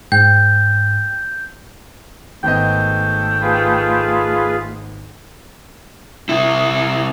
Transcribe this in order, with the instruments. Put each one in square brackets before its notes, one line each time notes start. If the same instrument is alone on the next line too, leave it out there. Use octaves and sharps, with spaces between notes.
[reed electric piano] G#2 [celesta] G5 [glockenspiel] G6
[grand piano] G#1 B3 D#5 [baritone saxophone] A3 [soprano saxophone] G5
[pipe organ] F4 G#4 B4
[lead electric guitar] C3 E4